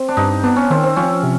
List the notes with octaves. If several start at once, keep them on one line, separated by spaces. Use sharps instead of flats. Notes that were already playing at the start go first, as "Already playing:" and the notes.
Already playing: C4
D4
G2 D#4
B3 D4
C#4
D#3 C4
C4
F3 C#4
C3